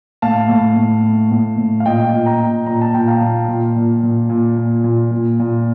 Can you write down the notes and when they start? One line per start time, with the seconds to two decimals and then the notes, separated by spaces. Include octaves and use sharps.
0.22 A2 F5 A5
0.49 A2
0.76 A2
1.04 A2
1.31 A2
1.58 A2
1.80 F5
1.86 A#2 D#5 G5
2.12 A#2
2.26 G5 A#5
2.40 A#2
2.66 A#2 A#5
2.81 A5
2.94 A#2 G5
3.08 F5 A5
3.21 A#2
3.48 A#2
3.76 A#2
4.03 A#2
4.30 A#2
4.57 A#2
4.84 A#2
5.11 A#2
5.39 A#2